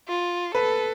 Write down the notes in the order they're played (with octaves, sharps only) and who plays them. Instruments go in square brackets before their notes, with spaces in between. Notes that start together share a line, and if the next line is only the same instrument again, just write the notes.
[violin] F4
[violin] A4 [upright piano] B4